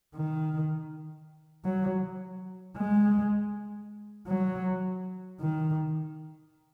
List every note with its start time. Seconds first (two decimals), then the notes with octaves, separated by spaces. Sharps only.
0.14 D#3
1.65 F#3
2.77 G#3
4.27 F#3
5.40 D#3